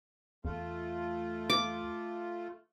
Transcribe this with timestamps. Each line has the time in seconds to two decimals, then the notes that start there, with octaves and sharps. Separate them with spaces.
0.45 E2 A3 F4
1.50 D6